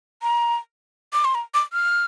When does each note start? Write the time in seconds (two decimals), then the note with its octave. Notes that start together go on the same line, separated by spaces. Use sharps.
0.22 A#5
1.13 D6
1.25 C6
1.35 A#5
1.54 D6
1.72 F6